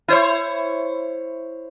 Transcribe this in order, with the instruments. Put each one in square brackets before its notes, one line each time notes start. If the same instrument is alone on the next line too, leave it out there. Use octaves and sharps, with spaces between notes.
[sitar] E4 C5 C#5